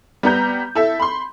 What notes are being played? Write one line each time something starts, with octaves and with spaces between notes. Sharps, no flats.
G3 B3 A#5 G6
E4 A4 E5
B5 C6